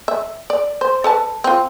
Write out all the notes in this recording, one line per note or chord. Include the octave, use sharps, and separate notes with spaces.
E5
D5
C5
A4 B4 A5
C4 F4